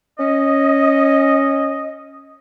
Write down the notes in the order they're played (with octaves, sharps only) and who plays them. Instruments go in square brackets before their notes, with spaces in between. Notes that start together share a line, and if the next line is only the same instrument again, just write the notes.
[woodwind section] C#4 D#5